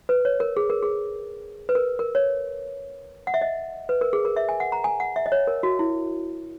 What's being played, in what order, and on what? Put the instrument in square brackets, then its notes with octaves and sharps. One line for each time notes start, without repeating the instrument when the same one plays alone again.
[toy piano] B4
C#5
A#4
G#4
A#4
G#4
B4
A#4
A#4
C#5
F#5
E5
D#5
B4
A#4
G#4
A#4
E5
G#5
F#5
A#5
G#5
F#5
E5
D#5
C#5
A#4
F#4
E4